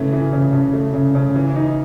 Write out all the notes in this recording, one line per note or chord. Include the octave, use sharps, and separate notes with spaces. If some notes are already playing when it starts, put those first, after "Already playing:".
Already playing: C#3 E3 A3
E3
C#3
C#3
A3
C#3
C#3
E3
D#4